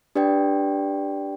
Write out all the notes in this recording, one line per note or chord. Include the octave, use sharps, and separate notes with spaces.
D4 G4 B4 D5 G5